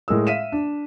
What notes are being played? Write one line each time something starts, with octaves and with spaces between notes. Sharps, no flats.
A2 G#3 A#4 E6
E5 F5 B6 D#7 E7
D4